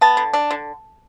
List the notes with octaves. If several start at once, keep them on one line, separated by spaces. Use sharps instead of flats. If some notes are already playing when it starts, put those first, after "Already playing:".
B3 A5
D3
D4
D3